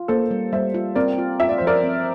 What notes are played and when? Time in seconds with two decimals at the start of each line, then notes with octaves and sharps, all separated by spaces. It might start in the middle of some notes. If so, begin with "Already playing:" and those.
Already playing: F4
0.08 A#3 A4 C5
0.31 G3
0.53 G3 C5 E5
0.74 F4
0.95 C4 A#4 D5
1.18 F4
1.40 F4 E5
1.49 D5
1.58 F3 C5
1.67 A#4 D5
1.84 C4